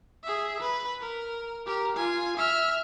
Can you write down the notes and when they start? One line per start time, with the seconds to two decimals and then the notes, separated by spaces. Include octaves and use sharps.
0.24 G#4 E5
0.61 B4
1.01 A#4
1.66 G4 A#4
1.97 F4 G#5
2.37 E5 F6